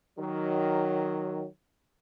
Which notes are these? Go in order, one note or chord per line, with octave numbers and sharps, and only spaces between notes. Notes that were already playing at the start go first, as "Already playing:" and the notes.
D#3 F#3